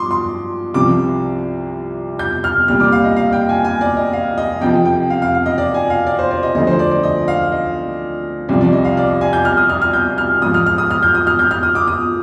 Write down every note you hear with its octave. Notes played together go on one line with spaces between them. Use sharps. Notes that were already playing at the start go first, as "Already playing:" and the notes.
Already playing: G2 F3 C6 D6 D#6
C6
C2 C3 F3 D6
G6
F6
C2 A#2 G3 F6
D6
F5
D#5
F5
G5
G#5
G#5
D5
D#5
F5
D#5
F2 C3 F3 G5
G5
F5
F5
F5
D#5
D5
G#5
F5
D5
C5
D5
D#5
D2 D3 F3 D#5
C5
D5
D5
D#5
F5
D#5
C2 C3 F3 D5
D5
D#5
F5
D5
D#5
G#5
G6
F6
D#6
F6
F6
G6
F6
G#2 F3 D#6
F6
F6
D#6
F6
G6
D#6
F6
G6
F6
D#6
D6
D#6